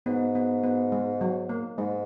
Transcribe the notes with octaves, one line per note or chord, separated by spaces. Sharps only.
G#2 B3
B3
B3
G#3
F#3
A#3
G#2 G#3